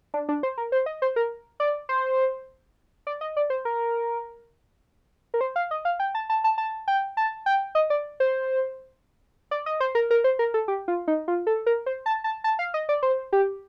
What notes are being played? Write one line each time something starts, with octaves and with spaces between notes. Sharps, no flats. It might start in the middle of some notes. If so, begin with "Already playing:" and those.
D4
D4
C5
A#4
C5
D#5
C5
A#4
D5
C5
D5
D#5
D5
C5
A#4
A#4
C5
F5
D#5
F5
G5
A5
A5
A5
A5
G5
A5
G5
D#5
D5
C5
D5
D#5
C5
A#4
A#4
C5
A#4
A4
G4
F4
D#4
F4
A4
A#4
C5
A5
A5
A5
F5
D#5
D5
C5
G4